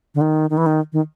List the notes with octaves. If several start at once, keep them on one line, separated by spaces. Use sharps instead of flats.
D3
D#3
D#3
E3
D#3
D#3